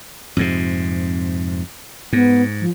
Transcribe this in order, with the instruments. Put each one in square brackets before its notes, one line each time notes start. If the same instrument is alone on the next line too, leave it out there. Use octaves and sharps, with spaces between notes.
[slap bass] F2 G#2 C3
[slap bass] G#2 [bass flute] B3
[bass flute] F3